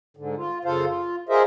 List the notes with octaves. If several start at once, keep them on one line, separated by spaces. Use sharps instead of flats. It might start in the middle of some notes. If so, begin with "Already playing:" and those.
G#2 D3
F4
F#2 C#3 F4 A4 C5 F5
F4
F4 G#4 A#4 C5 D#5 E5